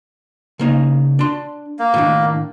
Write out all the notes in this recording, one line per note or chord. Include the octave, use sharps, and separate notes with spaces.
C#3 A#3 D#4
D4 C6
A#3
A2 D#3 D4